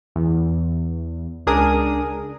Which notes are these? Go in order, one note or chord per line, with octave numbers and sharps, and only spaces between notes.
E2
C#2 D4 G#4 A#4 D#6